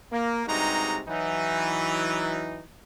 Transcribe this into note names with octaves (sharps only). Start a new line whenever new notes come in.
A#3
G2 C3 G#3 D#4 F#4 A#5
E3 F#3 D#4